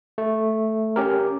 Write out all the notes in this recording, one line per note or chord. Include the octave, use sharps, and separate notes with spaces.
A3
C#4 G4 A#4